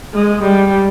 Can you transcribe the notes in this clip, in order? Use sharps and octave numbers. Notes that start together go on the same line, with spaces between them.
G#3
G3